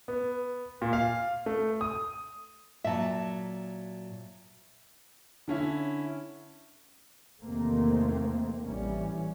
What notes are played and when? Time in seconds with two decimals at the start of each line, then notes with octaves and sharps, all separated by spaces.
0.08 B3
0.82 A#2
0.93 F5
1.46 A3
1.81 D#6
2.84 A#2 F#3 E5 A5
5.48 D3 C#4 E4
7.42 E2 C3 D#3 A3 A#3 C4
8.65 A1 E3 G3 C#4